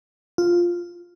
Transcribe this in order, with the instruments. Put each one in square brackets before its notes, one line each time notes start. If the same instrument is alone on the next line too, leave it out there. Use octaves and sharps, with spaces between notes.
[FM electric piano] F4